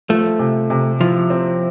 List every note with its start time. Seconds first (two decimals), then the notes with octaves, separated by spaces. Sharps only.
0.09 F3 A3
0.39 C3
0.70 C3
1.01 F3 E4
1.30 C4